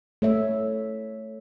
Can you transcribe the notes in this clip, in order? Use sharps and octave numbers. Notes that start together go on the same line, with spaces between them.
A3 C#5 E5